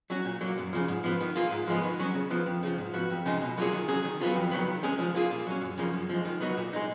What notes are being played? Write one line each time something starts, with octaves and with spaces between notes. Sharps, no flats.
F#3 C#4 F#4
A#2
F#3 A#3
F#2
C#3 F3
G#2
F3 B3
D#3
A#3 F4 G#4
G#2
F3 G#3 B3
D#3
F#3 C#4 F#4
C#3
F3 B3
F2
C#3 F3
G#2
F3 B3 F#4
F2
C#3 F3 G#3 D#4
B2
F#3 A#3 F4 G#4
D#3
F#3 C#4 G#4
D#3
F#3 B3 F4 G#4
F2
D#3 F#3 B3
D#3
G#3 C#4 G#4
F3
A#3 F4 G#4
A#2
F#3 C#4
F#2
C#3 F3 A#3
F#2
F3 G#3
D#3
F#3 B3 D#4 F#4
A#2
G#3 D#4